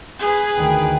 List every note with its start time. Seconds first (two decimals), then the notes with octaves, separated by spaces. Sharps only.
0.20 G#4 B4
0.57 D2 D#3 G5